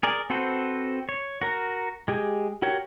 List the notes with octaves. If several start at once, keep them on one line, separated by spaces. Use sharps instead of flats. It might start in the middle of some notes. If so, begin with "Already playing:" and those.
G#4 A#4 D5
C4 F#4 A4 B4 C5
C#5
F#4 A#4 A#5
G#3 G4 G#4
F#4 G4 A#4 C#5